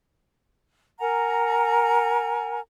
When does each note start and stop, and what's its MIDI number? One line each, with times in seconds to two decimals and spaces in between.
1.00 2.60 70
1.00 2.60 78
1.00 2.60 80
1.00 2.60 82